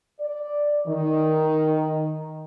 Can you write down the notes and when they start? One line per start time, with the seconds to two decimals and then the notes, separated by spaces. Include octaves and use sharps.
0.21 D5
0.87 D#3